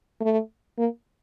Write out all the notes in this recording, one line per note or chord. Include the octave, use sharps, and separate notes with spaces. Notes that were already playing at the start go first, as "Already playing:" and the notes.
A3
A#3